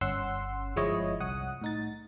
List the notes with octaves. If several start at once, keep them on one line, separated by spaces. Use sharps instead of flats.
G1 C#4 F#5 C6 E6
G1 F3 G#3 E4 C#5 D#5
C2 F#5 D#6
A2 D#4 A6